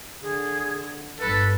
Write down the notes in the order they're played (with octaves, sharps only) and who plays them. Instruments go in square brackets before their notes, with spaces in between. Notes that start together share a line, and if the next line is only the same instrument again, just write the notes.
[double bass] D3 [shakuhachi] G#4
[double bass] G1 G2 [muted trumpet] A4 [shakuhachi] B4